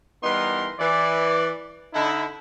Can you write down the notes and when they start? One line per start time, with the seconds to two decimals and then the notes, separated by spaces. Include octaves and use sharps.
0.23 E3 G3 B3 D#4 A#4 C6
0.79 E3 D5
1.94 D3 D#4 E4